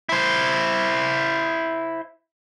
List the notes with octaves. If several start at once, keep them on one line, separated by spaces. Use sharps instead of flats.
E4 C5